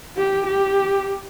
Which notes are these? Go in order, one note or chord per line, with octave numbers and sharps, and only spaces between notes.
G4
G4